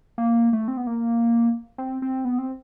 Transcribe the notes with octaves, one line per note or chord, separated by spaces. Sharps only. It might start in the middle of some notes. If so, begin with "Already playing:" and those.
A#3
A3
C4
B3
A#3
C4
C4
B3
C4